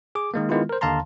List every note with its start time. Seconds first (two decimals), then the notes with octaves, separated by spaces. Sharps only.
0.15 G#4 D6
0.34 D#3 G#3 A#3
0.49 D#3 G#3 B3 E4 F4
0.69 A#4 C5
0.81 D#2 D3 F5 A5 A#5 C6